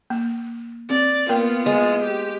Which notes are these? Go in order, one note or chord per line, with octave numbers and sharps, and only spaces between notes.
A#3
C4 D5
A#3 B3 F4 A#4 G5
G#3
G4